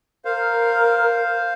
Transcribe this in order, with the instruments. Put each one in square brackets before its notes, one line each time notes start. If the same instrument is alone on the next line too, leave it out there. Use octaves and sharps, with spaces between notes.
[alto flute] A#4 [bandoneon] C5 F5